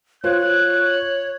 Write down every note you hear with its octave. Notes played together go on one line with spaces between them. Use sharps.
F4 C5 C#5 F#6